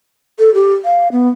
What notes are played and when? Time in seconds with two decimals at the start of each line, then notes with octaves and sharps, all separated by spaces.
0.39 A4
0.54 G4
0.85 F5
1.12 B3